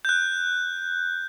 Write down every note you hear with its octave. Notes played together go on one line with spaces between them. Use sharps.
F#6 G6